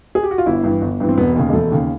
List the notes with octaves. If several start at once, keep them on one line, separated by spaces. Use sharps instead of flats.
G#4
G4
F#4
F4
G1 E4
G2 E3
G1
G2 E3
C4
E1 B3
D#2 C#3
G#3
E1 A3
D#2 C#3